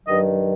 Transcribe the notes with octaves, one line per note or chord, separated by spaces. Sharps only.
G2 D#3 F#3 D#5